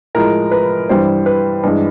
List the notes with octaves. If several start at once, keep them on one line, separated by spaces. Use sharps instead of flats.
A2 F3 G#3 A#4
B4
G2 E3 G3 C5
B4
G2 E3 G#3